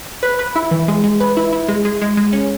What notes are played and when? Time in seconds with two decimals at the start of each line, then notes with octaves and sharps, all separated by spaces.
0.23 B4
0.39 B4
0.56 E4
0.71 E3
0.88 G#3
1.04 G#3
1.20 B4
1.37 E4
1.53 E4
1.68 G#3
1.85 G#3
2.01 G#3
2.17 G#3
2.33 C#4